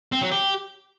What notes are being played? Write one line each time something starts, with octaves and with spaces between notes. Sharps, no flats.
C4
F#3
G4